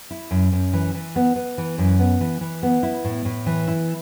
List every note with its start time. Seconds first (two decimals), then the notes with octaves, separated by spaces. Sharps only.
0.11 E4
0.31 F#2
0.52 F#2
0.73 E3
0.94 E3
1.16 B3
1.36 B3
1.58 E3
1.78 F#2
1.99 B3
2.21 E3
2.41 E3
2.63 B3
2.83 E4
3.04 A2
3.25 A2
3.46 E3
3.68 E4